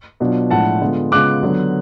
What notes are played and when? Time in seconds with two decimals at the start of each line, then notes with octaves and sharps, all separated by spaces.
0.20 B2 F#3 B3 D4 F4
0.51 A2 F3 G#3 D4 F4 F#5 A5
0.81 D3 G#3 B3 F4
1.12 C#3 G#3 B3 F4 D6 F#6
1.43 D3 F#3 B3